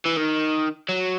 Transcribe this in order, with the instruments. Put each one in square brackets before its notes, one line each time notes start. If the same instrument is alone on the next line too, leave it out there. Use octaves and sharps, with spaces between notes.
[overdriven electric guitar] E3
D#3
F#3